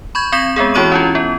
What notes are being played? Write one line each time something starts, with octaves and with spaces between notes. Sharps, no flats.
B5 C#6 G6 G#6
C4 C#6 G6 A#6 B6 E7
G#3 B3 C4 G#4
E3 E4 F#4 C#5 C#6 D#7
C#4 E4 F4
B3